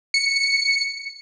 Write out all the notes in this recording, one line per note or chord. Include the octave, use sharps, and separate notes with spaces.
C#7